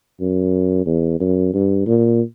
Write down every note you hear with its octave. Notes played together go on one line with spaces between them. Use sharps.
F#2
E2
F#2
G2
A#2